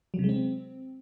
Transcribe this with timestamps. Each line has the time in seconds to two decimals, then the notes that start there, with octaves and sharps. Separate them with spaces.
0.14 F#3
0.19 C3
0.24 G#3
0.29 C4